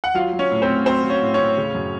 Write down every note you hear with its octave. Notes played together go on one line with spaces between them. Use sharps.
F#5
F#3 F4 F5
F#3
C#4 C#5
A2
C4 C5
A2
F#3 C4 C5
F#3
C#4 C#5
A2
C#4 C#5
A2
C#3
F#2